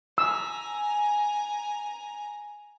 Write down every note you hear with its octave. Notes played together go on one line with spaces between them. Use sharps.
G#5 A#5 E6